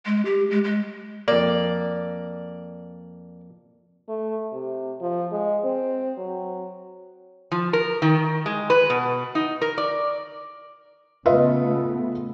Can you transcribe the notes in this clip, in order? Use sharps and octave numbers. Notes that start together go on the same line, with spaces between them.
G#3
G4
G#3
G#3
F2 A#3 D5
A3
C3
F3
G#3
C4
F#3
F3
A#4
D#3
G#3
B4
B2
D#4
A#4
D5
C#3 A3 B3 F4 B4 D#5 E5